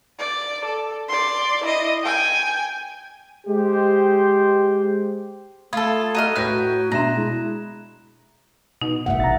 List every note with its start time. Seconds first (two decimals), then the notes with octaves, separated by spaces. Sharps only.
0.19 D5
0.65 A4
1.09 D5 C6
1.64 E4 D#5
2.03 G5 G#5
3.48 G#3 G4 C5
5.73 A3 F4 A4 B5 D#6 G#6
6.15 F#4 D#5 A#5 F6 D#7
6.36 A2 F#4 B4 C#5 G5 F#6 A#6
6.92 B2 D4 E5 A#5 C6 F#6 E7
7.16 G#3 E4
8.81 B2 D#4
9.06 G1 C2 A2 E5 F#5
9.20 A1 A#5 A6